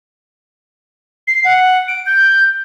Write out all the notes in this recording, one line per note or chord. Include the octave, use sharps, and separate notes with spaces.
C7
F#5
D7
G6